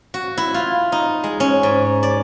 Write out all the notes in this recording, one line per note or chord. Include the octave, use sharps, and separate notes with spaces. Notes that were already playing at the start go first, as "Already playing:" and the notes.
F#4
E4
F4
D#4
G#3
C#4
G#2
D5